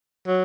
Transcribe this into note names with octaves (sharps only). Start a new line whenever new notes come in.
F#3